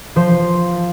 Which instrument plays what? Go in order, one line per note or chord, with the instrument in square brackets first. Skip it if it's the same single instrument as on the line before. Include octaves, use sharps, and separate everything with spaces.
[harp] F3 C5